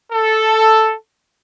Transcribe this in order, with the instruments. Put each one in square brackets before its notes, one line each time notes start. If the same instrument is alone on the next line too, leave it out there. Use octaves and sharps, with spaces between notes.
[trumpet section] A4